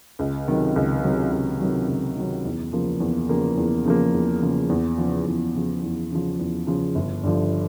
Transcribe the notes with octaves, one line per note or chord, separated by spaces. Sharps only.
C#2
C3 D#3 F#3
C#2
C3 D#3 F#3
C#2
C3 D#3 F#3
C#2
C3 D#3 F#3
E2
C#3 F3 A#3
E2
C#3 F3 A#3
E2
C#3 F3 A#3
E2
C#3 F3 A#3
E2
C#3 F3
E2
C#3 F3
E2
C#3 F3
E2
C#3 F3
G1
G2 D3 F3